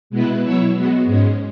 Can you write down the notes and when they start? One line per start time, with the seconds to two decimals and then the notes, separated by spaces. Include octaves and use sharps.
0.10 B2 G#3 B3 E4 B4
0.41 B2 F#3 E4 C#5 E5
0.73 G#3 B3 F#4
1.05 G#2 G#3 C#4